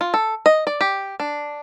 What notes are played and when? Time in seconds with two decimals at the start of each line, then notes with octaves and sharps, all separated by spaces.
0.01 F4
0.14 A4
0.46 D#5
0.67 D5
0.81 G4
1.20 D4